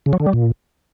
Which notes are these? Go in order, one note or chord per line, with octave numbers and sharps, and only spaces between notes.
C#3
F#3
D3
G3
A#2